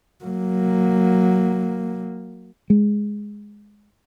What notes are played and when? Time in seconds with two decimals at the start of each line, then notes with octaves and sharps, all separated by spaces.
0.24 F#3 A#3
2.70 G#3